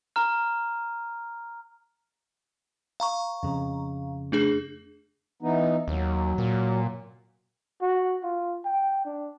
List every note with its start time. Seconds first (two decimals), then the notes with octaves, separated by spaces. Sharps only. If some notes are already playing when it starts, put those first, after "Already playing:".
0.16 A#5 F6
3.00 F5 A#5 C#6
3.43 F2 C#3
4.32 A3 D4 G#4
5.42 E3 B3 D#4
5.88 D#2 F#3
6.38 A#2
7.82 F#4
8.23 F4
8.65 G5
9.05 D4